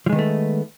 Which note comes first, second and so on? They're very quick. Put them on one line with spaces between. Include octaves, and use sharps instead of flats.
F3 G#3 D#3 B3 A3